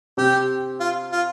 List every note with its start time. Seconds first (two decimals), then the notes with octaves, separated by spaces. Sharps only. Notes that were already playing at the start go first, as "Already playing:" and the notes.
0.17 C3 C4 G4
0.80 F4
1.12 F4